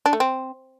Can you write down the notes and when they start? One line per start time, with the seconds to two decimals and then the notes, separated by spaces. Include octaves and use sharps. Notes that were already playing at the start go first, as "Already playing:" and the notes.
0.06 D4
0.13 A3
0.20 C4